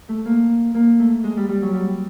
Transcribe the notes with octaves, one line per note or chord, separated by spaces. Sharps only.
A3
A#3
A#3
A3
G#3
G3
G3
F#3
G3